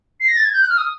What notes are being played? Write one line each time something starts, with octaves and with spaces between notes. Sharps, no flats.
C7
A#6
A6
G#6
G6
F#6
F6
D#6